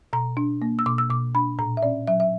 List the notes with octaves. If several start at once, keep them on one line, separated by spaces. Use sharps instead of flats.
B2 A#5
D4
A#3
E6
B2 D6
E6
B2 D6
D4 B5
A#2 A#5
E5
C#4 D5
F#3 E5
E5